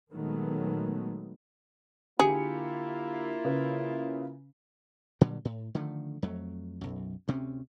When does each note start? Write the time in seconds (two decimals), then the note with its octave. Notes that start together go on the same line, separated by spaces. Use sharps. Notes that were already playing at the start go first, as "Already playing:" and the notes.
0.13 A#2 D#3 F#3 G#3 A3 B3
2.19 D3 A#3 E4 F4 G4 G#4 C#7
3.44 C#3 B4
5.21 A#2 D3 F#3 G3
5.45 A2
5.75 D3 D#3 F3 A3
6.22 F2 F#3 A3
6.81 B1 F#2
7.28 D2 C3 C4 C#4